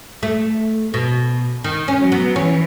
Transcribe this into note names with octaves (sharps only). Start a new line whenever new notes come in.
A3
B2
D#3
C#4
F#3
B3
E3 C#4